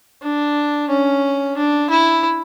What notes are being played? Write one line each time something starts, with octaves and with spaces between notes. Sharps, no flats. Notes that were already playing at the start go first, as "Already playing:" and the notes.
D4
C#4
D4
E4